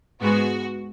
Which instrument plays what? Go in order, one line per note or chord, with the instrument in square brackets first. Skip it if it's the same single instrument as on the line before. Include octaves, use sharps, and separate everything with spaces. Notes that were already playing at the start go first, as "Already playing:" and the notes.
[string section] G#2 G#3 B3 F#4